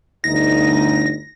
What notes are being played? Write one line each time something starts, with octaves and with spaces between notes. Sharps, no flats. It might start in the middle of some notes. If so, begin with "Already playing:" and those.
G1 D2 D#4 A#6